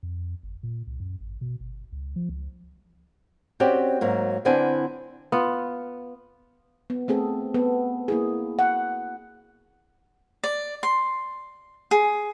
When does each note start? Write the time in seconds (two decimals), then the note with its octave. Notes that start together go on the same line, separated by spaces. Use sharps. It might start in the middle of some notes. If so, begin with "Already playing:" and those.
0.03 F2
0.43 G1
0.63 A#2
0.87 C2
1.00 F#2
1.21 G#1
1.41 B2
1.60 G1
1.92 C#2
2.16 F3
2.29 C#2
3.60 C4 C#4 F#4 G4 D5
4.01 G#2 F#3 A#3
4.45 D3 B3 C4 D4 E4 G#5
5.32 B3 F4
6.90 B3
7.08 A3 C4 G#4 A4
7.54 B3 A4
8.08 A#3 E4 G#4
8.59 F#5
10.44 D5
10.83 C6
11.91 G#4